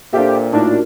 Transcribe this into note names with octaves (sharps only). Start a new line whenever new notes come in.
A#2 D4 F4 G4 A4 C5 E5 G5
A2 D4 D#4 F4 F#4 A#4